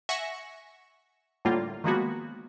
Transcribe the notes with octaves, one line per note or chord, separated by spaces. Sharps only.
E5 F#5 G#5 C#6 A#6 C#7
A2 D3 G3 A#3 F4
D#3 F3 G#3 A#3 B3 F#4